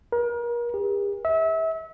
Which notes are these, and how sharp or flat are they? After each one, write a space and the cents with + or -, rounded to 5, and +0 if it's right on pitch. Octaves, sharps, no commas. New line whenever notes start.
A#4 +35
G4 +45
E5 -30